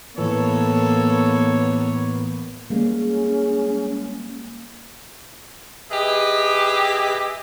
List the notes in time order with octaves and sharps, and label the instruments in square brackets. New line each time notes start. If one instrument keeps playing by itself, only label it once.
[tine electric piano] A2 E3 [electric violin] A#3 B3 [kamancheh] A4 [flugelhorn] C#5
[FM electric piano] G3 G#3 [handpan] A#3 [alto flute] C#4 [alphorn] G#4
[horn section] G4 G#4 B4 D#5 E5 G#5